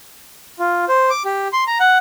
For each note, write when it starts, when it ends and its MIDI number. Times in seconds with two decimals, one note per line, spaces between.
0.59 0.85 65
0.89 1.10 72
1.10 1.23 86
1.25 1.48 67
1.53 1.64 84
1.67 1.78 82
1.80 1.98 78